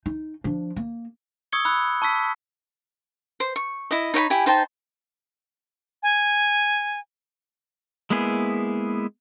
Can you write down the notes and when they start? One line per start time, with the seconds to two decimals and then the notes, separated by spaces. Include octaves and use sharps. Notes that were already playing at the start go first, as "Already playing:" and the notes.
0.06 D#4
0.44 F3 D4
0.76 A#3
1.52 C#6 D#6 E6 G#6 C#7 G7
1.65 B5 E6 F#6 C#7
2.02 A5 C#6 E6 B6
3.40 C5
3.56 C#6
3.91 E4 D#5
4.14 D#4 C#5 G5 B5
4.30 E4 G4 G#5
4.46 D#4 C5 G5 A5
6.03 G#5
8.10 G#3 A#3 B3 E4 G#4